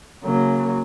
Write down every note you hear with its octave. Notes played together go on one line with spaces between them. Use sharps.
C#3 F#3 A#3